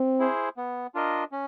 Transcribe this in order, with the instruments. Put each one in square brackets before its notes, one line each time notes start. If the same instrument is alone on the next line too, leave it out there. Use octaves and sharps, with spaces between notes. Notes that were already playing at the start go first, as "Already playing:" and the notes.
Already playing: [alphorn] C4
[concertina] E4 G#4 C5
B3
D4 F4 A#4 D#5
C#4